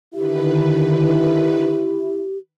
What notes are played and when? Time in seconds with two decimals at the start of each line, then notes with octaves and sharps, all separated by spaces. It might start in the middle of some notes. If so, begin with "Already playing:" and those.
0.13 D3 D#3 E4 G4 B4